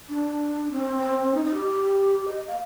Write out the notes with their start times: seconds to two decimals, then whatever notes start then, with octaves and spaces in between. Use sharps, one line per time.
0.09 D4
0.72 C4
1.34 D#4
1.45 D#4
1.54 G4
2.28 D#5
2.48 F5